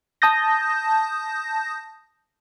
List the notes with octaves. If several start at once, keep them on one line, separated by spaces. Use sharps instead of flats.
A5 D#6 G6 A#6